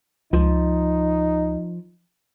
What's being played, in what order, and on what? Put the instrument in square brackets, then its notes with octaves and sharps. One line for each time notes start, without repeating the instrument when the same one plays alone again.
[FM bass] C#2 [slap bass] F3 [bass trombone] D#4